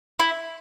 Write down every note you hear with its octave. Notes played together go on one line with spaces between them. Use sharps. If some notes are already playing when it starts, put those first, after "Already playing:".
E4